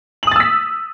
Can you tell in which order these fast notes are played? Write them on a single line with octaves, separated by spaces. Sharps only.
F#7 D#6 A6 E6 B6